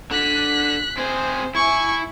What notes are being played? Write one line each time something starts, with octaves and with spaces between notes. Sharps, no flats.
D3 F#6 B6
C4 G#4 C5
E4 G#5 C#6